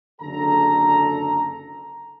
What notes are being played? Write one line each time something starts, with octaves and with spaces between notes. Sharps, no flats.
F#1 D3 A4 A#5